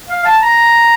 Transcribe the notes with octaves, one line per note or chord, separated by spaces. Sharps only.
F5
A5
A#5